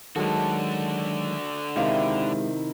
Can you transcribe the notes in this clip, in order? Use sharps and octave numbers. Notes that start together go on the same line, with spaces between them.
D3 D#3 F#3 G#3 F#4 A4
C3 D#3 G#3 E4 G4 A#4 C5 F5